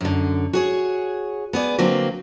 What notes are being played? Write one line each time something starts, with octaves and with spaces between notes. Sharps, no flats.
F#2 D3
F#4 G#4 C#5
B3 G#4 D5
D3 F#3 A#3 C4